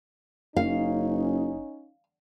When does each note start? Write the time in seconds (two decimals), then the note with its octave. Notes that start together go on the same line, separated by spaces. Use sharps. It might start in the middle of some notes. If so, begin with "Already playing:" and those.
0.56 F#1 C#4 D#4 F5